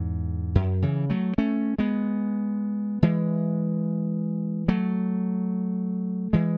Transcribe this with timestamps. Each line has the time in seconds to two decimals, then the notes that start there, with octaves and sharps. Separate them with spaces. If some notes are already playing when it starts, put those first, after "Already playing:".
Already playing: E2 G#2
0.55 F#2
0.82 C#3 E3
1.10 F#3 A3
1.38 A3 C#4
1.78 G#3 B3
3.03 E3 G#3
4.68 F#3 A3
6.33 E3 G#3